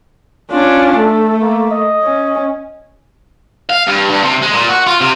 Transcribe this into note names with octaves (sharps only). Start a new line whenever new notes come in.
C#4 D4 F4
A3 A4
A#3
D#5
C#4
F5
G2
G2
C3
G#3
A#2
F#4
F4
C3